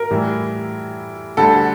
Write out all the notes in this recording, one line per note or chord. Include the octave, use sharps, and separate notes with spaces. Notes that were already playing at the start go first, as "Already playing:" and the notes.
Already playing: A#4
A2 E3 G3
D2 D3 G3 A4